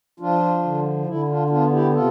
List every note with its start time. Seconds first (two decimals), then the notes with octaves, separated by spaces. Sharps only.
0.20 F3 D4 F4
0.64 D3
1.06 D3 E4
1.28 D4 F4
1.49 B3 D4 F4
1.71 E4 G4
1.93 C3 F4 A4